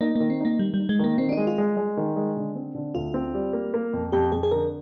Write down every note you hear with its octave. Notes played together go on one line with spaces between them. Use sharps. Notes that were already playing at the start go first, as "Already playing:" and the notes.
A#3 D#4
D#3 A#3
C4
A#3 D#4
D#3 G3
G3
D#4
G#3
D#3 A#3
D#3 C4
D4
G#3 D#4
F4
G#3
G#3
D#3
G#3
D3
C4
D3
D2 F4
C4
G3
A#3
A#3
F2
F2 G4
F2 G#4
G#4
D3 A#4